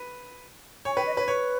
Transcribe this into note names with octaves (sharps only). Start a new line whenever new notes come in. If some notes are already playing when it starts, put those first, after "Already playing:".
Already playing: B4
C#5 G#5
B4 G5
D#5
B4 C#5
B4 C#5